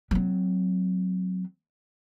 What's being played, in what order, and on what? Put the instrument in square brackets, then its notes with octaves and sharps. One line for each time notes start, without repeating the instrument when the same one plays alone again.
[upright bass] F#3 C4